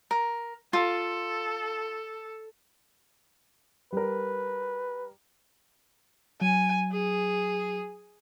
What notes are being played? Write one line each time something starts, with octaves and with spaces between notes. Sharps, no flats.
A#4
F4 A4
G3 A#4 B4
F#3 G#5
G#4